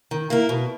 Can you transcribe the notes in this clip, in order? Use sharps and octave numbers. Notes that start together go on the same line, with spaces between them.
D#3
A#3 E4 A#4
B2